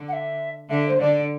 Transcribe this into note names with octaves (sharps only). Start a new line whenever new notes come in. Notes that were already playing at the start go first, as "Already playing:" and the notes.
Already playing: D3
F#5
E5
D3 E5
C5
D3 D5